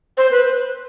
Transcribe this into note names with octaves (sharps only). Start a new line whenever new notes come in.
C5
B4